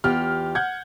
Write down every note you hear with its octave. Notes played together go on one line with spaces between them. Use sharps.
E2 F4 G4 F6
F#5 G6 G#6